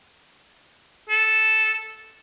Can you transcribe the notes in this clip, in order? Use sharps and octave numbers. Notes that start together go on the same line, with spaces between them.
A4